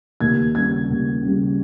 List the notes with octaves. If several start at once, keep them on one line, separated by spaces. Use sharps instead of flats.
D#2 G#6
C#3 G3 G#6
D#2
C#3 G3